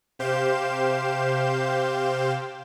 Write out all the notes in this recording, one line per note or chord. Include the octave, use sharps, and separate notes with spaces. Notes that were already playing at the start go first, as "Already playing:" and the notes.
C3 G4 C5 F5 G6 E7